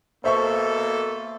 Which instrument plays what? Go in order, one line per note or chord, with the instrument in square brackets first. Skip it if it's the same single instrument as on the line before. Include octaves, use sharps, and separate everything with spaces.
[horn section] B2 A#3 A4 [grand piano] C5 E5 C#6